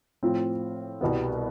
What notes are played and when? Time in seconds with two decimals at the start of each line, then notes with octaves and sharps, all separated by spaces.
0.23 A2 F3 C4 F4
1.01 C2 B2 G3 B3